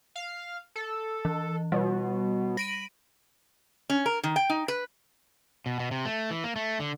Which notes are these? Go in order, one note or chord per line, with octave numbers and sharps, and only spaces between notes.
F5
A4
E3
B2 G3
B5 A#6 D7 D#7
C#4
A#4
D#3
G5
D#4
B4
B2
B2
C3
A3
E3
A#3
A3
D3